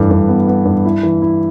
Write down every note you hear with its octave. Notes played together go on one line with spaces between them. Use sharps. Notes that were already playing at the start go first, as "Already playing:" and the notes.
Already playing: G2 E3 A3
G2
B3
B3
G2
E4
E3
E4